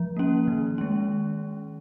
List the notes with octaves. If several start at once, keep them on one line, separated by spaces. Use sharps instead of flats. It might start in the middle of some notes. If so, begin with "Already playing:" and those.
Already playing: F3
A#3 C#4
D#3
G#3 C#4